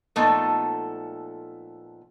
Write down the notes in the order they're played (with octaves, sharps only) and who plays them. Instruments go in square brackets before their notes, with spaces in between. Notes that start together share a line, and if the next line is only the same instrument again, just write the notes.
[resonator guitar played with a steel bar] A#2 F3 A3 B3 D#4 A4